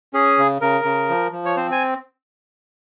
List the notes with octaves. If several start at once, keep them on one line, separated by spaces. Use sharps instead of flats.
C#4 G#4
C#3
C#3 A#4
C#3
F3
F3
C#5
C4 C5
G#5